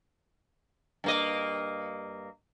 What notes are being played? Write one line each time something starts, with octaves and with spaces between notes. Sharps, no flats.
G2 A#3 D#5